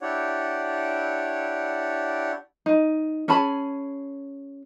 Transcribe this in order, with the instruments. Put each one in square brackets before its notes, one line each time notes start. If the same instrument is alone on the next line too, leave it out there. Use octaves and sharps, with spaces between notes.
[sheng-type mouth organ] D4 E4 G4 C#5 D5 F#5
[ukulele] D#4
C#4 G#4 A5 B5